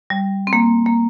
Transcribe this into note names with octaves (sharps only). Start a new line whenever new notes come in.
G3
C4
A#3
A#3